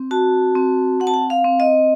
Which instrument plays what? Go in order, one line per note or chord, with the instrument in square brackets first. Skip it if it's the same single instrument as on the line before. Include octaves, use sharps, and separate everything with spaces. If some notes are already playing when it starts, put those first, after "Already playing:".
Already playing: [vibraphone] C4
F#4 A5
C4
C4 F#5
A5
F#5
F5
C4
D#5